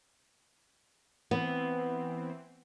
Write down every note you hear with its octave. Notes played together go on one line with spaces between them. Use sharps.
E3 B3 C4